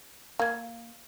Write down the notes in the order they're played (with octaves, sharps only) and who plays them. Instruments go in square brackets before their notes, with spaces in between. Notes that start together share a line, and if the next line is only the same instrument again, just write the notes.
[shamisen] A#3 [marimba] F5 G#6